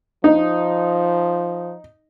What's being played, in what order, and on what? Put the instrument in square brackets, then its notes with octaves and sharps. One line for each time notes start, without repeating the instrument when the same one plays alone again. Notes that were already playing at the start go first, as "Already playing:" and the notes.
[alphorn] F3 [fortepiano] D#4